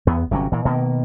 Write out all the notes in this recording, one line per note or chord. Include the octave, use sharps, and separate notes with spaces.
E2 B3
G1 C3 F#3 C#4
A#2 E3
B2 D#3 A#3